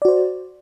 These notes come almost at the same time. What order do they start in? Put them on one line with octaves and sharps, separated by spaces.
D5 F#4 C5